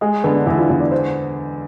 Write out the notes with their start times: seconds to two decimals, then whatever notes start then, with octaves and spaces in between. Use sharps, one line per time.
0.01 G#3 G#4
0.24 D3 B3
0.35 D4
0.46 E2 E4
0.58 F4
0.69 E2 F4
0.80 D5
0.91 C5